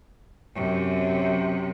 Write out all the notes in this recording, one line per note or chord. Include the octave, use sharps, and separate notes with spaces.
F#2 C3